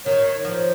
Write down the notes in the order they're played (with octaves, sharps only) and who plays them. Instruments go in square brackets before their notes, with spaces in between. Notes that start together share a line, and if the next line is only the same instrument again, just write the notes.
[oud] D#3 [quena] C#5
[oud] F3